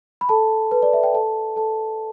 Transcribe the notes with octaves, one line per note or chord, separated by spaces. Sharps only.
B5
A4 A5
B4
D5
E5
G5
A4 A5
A4 A5